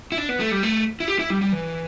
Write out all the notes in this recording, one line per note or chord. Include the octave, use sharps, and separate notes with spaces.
E4
D4
B3
A3
G3
A3
E4
G4
E4
G3
G3
E3